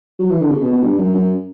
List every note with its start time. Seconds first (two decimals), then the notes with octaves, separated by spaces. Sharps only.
0.19 F#3
0.30 E3
0.41 D3
0.51 C#3
0.62 B2
0.73 B2
0.83 G2
0.99 F#2
1.15 F#2